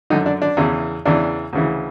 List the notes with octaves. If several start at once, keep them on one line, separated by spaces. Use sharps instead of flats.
F#2 D3 D#4
D4
D4
E2 C#3 E3
E2 C#3 E3 D4
D2 C#3 E3